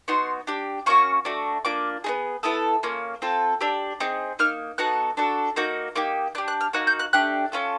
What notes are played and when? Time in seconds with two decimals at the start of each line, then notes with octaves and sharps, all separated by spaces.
0.08 B3 D#4 F#4 C6
0.47 D4 G4
0.86 A#3 C#4 F#4 C#6
1.25 A3 D4 F#4
1.65 A#3 D4 F4 D6
2.04 B3 D#4 G#4
2.43 B3 E4 A4 D#6
2.83 A#3 C#4 F4
3.22 C4 F4 A4
3.61 D4 G4 E6
4.00 C4 D#4 G#4
4.39 A#3 D#4 F6
4.78 B3 D#4 F#4 A4 F#6
5.17 D4 F#4 A4
5.56 A#3 D#4 F#4 G6
5.96 A#3 D#4 G4
6.35 D4 G4 F#6
6.48 F#6
6.61 F6
6.73 A#3 D#4 F#4 F#6
6.87 G6
6.99 F#6
7.13 A3 D4 G4 F#6
7.52 C#4 F4 A4